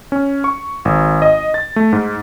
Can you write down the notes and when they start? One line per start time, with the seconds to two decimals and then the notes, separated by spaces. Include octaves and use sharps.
0.12 C#4
0.44 C#6
0.85 G#1
1.22 D#5
1.54 A6
1.76 A3
1.93 G#2